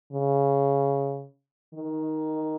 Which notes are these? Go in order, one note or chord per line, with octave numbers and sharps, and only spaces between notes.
C#3
D#3